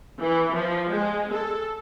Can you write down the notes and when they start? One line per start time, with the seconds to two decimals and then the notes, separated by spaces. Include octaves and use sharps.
0.19 E3
0.55 F3
0.90 G#3
1.33 A4